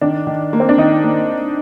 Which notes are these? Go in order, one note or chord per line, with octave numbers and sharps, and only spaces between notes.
D#3 D4
D#3
A#3
C4
D4
D#3 D#4
A#3